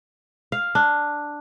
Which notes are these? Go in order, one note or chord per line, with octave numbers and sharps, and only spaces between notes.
F5
D4